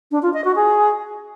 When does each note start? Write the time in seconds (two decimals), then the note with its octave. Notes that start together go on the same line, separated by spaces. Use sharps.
0.11 D4
0.22 F4
0.34 D#5
0.45 F#4
0.56 G#4